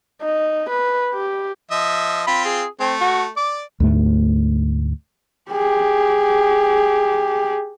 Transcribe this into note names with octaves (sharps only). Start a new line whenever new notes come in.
D#4
B4
G4
F3 D#5 E5
C4 F4 B5
G#4
A3 C4
F#4
D5 D6
D2 G#2 A3
G4 G#4